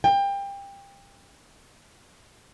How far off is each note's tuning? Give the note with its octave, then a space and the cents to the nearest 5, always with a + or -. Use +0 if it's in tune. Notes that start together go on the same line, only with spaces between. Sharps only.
G5 +25